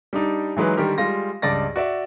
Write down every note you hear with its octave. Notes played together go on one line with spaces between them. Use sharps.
G3 D4 D#4
E3 F#3 G#3 D#4 B4
D3 D#3 G3 G4 A#4
G3 G#3 F4 A#6
C#2 G2 D5 A6 A#6
F#4 D5 E5